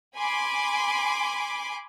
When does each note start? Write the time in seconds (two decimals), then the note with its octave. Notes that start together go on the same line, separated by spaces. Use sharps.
0.16 G#5 B5 C6 D6